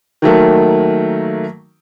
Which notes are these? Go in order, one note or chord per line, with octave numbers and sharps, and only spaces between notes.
D#3 F#3 A3 A#3